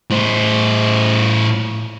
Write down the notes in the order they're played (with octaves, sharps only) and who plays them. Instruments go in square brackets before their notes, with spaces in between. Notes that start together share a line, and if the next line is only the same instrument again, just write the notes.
[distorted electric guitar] A2 C5